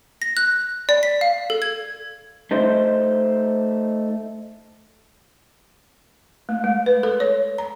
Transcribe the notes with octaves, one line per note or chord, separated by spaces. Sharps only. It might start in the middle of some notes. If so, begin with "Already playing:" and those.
A#6
F#6
D5
B6
F5
A4
G#6
A3 D#4 C5
A3
G#3
B4
A4
C#5
A#5